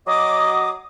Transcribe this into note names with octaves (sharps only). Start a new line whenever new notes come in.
F#3 D#5 D6 D#6